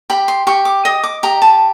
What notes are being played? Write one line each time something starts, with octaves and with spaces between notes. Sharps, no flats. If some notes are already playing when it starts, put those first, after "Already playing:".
G4 B5
C6
G4 C#6
D6
D#5 D#6
D6
G4 A#5
A5